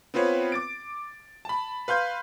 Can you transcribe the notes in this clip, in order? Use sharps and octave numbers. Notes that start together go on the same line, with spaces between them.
B3 C4 F4 B4 C#5
D6 A6 D7
A5 B5
B4 F5 C6 G6